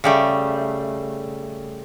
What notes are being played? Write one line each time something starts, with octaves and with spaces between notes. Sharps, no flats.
C#3 G3 A3